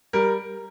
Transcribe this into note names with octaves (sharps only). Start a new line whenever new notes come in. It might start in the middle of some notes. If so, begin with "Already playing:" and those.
G3 A#4